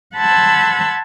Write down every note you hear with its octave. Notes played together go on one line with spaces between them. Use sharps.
F#5 A5 B5 C6 E6 G#6